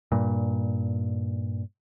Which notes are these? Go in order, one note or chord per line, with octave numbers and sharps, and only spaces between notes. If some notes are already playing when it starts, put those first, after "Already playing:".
G2 A#2